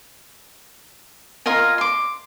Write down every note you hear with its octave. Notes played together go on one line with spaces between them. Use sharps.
F4 A#4 D#5 G#5
C6 D6